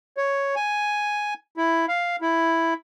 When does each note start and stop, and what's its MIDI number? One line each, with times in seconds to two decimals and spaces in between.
0.17 0.55 73
0.56 1.34 80
1.57 1.86 64
1.89 2.16 77
2.21 2.74 64